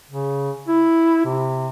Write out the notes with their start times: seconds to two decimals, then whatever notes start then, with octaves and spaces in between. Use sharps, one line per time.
0.10 C#3
0.68 E4
1.25 C3